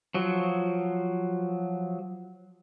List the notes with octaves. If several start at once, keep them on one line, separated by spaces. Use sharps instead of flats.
F3 F#3